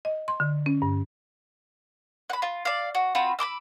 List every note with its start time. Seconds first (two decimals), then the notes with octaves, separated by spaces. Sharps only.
0.05 D#5
0.28 C6
0.40 D3
0.66 C#4
0.82 G2
2.30 F#5 B5
2.42 F4
2.65 D5 F5
2.95 F#4
3.15 C4 F4 F#4 B5
3.39 B5 C6 D6 E6